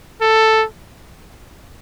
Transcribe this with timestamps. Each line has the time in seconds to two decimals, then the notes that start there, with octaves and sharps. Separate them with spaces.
0.21 A4